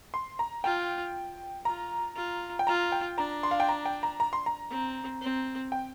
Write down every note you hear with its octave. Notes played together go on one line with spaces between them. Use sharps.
C6
A#5
F4 G5
F4 A#5
F4
G5
F4 A#5
G5
D4 A#5
C6
F5
G5
A#5
G5
A#5
A#5
C6
A#5
C4
C4
G5